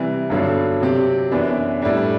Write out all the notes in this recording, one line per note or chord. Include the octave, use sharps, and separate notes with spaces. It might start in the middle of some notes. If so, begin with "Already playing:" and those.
Already playing: C3 E3 G3
G2 D3 F#3 B3 D4
C3 F#3 C4 G4
F#2 E3 B3 D4
A2 G3 D4